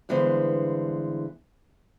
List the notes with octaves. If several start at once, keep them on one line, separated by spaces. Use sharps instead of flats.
G2 D3 E3 G#3 B3 C5